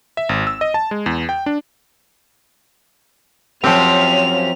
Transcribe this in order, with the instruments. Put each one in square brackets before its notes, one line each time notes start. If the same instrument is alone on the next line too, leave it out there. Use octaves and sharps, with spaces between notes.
[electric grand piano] E5
G#1
E6
D#5
A5
G#3
E2
G5
D4
[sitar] F#2 C#4 G4 [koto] F3 C4 [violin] F7